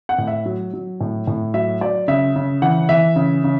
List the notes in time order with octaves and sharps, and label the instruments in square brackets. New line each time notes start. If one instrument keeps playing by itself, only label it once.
[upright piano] F#5
A2
E5
F#3
F#3
A2
A2
F#3 E5
F#3 D5
C#3 E5
C#3
E3 F#5
E3 E5
C#3
C#3